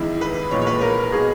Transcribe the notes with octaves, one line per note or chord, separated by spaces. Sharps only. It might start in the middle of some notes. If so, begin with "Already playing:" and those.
Already playing: E2 D#3 G#3 E4
B4
A#1 A#2 G#3 C#5
C#5
B4
A#4
B2 G#3 G#4